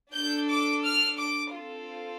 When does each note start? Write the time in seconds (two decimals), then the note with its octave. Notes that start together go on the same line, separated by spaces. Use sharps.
0.13 D4 A4 G6
0.49 D6
0.84 F6
1.19 D6
1.53 C4 F4 A4